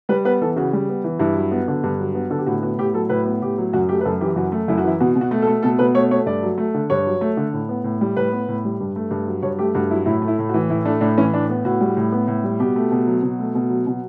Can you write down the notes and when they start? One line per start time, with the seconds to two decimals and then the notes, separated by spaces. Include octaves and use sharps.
0.09 G3 B4
0.25 B3 B4
0.41 E3 A4
0.56 C#3 F#4
0.73 G3
0.89 B3
1.04 E3
1.20 G2 E4
1.35 F#3
1.51 B3
1.68 D3
1.84 G2
2.00 F#3
2.15 B3
2.30 D3 A4
2.38 G4
2.46 A2 F#4
2.62 B3 F#4
2.78 A2 G4
2.94 F#3 A4
3.09 A2 B4
3.25 B3
3.42 A2 G4
3.58 F#3
3.73 F#2 F#4
3.89 A3 G4
4.01 B4
4.05 F#2 A4
4.21 E3 G4
4.36 F#2 F#4
4.52 A3
4.68 F#2 E4
4.78 F#4
4.84 E3 E4
5.00 B2 F#4
5.16 B2
5.21 F#4
5.31 A3
5.42 A4
5.47 A3
5.63 B2 A4
5.79 B2 B4
5.94 A3 C#5
6.11 A3 C#5
6.26 G2 D5
6.43 F#3
6.58 A3
6.74 D3
6.90 G2 C#5
7.06 F#3
7.21 A3
7.37 D3
7.53 A2
7.69 B3
7.84 A2
8.01 G3
8.16 A2 B4
8.32 B3
8.48 A2
8.65 G3
8.80 G2
8.96 A3
9.11 G2
9.27 F#3
9.43 G2 C#5
9.59 A3 G4
9.74 G2 F#4
9.91 F#3 E4
10.06 A2 E4
10.22 A3
10.28 E4
10.39 A2
10.49 F#4
10.54 E3
10.70 A2 E4
10.85 A3 D4
11.01 A2 D4
11.17 E3 C#4
11.34 A2 D4
11.49 B3
11.65 A2 F#4
11.81 G3
11.97 A2
12.12 B3
12.28 A2
12.44 G3
12.60 B2 G4
12.76 A3
12.91 B2
13.07 F#3
13.23 B2
13.39 A3
13.55 B2
13.70 F#3
13.87 B2